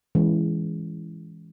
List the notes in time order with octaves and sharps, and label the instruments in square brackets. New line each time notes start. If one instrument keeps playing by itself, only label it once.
[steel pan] E3 G#3 C#4 G#4